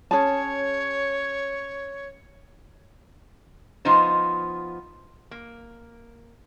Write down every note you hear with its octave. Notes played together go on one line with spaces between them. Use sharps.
C#4 G#4 C#5 A5
F3 B3 D#4 F4 C5
A#3